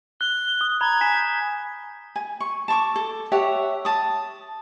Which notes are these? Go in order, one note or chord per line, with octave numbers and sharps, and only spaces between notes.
F#6 G7
D#6
A#5 B5 G#6
G#5 B6 E7
G6
G#5
C#6
A5 C#6 D6
A4
G4 C#5 E5 F#5
A5 D#6